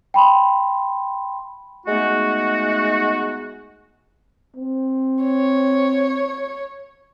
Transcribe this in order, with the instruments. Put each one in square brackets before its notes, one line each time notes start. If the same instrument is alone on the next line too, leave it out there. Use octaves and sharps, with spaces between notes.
[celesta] G5 B5 C6
[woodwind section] G#3 A3 B3 D#4 F#4
[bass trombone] C4
[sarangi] C#5